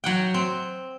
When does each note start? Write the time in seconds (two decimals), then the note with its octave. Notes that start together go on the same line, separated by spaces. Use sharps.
0.04 F#3 F#5 G5
0.34 C4